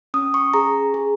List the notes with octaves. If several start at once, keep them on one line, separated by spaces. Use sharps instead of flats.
C#4 D#6
C#6
G#4 A#5
G#4